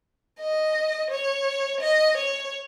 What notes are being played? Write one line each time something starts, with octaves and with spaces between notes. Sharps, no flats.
D#5
C#5
D#5
C#5